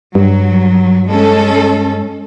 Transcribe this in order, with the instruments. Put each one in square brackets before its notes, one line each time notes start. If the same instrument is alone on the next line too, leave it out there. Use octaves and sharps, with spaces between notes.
[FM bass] G2 [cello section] F#3
[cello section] G#3 C#4 A4